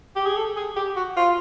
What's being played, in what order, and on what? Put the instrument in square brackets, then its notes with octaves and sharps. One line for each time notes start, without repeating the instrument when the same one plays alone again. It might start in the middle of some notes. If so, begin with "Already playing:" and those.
[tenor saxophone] G4
G#4
A4
G#4
G4
F#4
F4